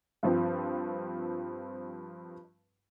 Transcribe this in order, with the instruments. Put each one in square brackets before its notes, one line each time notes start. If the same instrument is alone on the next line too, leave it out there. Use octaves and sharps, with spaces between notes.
[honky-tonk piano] G2 F3 C4